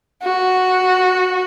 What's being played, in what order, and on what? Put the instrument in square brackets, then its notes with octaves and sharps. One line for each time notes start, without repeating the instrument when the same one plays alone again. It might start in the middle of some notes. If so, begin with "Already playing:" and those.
[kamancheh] F#4